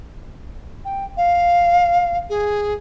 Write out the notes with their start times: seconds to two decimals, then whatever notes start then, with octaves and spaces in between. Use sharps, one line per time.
0.85 G5
1.17 F5
2.30 G#4